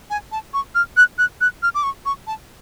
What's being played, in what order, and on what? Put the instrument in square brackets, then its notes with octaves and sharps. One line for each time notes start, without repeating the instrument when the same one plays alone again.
[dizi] G#5
A5
C#6
F6
F#6
F#6
F#6
F6
D6
C#6
C#6
A5